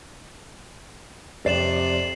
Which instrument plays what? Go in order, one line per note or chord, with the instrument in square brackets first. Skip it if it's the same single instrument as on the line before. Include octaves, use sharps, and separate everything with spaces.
[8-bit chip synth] F2 [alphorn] C3 [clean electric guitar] D5 [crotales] C7 E7 F#7